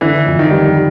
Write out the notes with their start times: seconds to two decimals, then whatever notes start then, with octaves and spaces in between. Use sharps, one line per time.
0.01 D3 E3
0.26 F2
0.39 D#3
0.51 G3